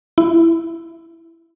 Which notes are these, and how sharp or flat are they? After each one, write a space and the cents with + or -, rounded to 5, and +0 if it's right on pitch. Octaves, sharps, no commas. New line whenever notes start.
E4 +5